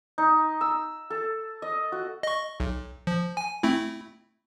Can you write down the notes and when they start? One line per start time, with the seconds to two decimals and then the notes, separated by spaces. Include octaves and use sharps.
0.18 D#4
0.61 E6
1.10 A4
1.62 D#5
1.92 F#4
2.23 D#5 C#6
2.60 B1
3.07 F3
3.37 G#5
3.63 A3 C4 E4